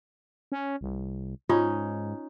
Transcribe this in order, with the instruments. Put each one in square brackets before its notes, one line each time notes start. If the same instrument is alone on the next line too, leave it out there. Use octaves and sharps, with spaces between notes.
[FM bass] C#4
C2
[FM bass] G#2 [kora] C#4 D#4 [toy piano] F4